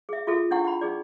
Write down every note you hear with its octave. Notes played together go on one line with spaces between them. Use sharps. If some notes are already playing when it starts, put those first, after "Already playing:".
G#4 E5
F4 F#4 G#4 A4 E5
D4 E4 F#5 G5 C#6
F#5 G5 B5
D#4 G#4 D5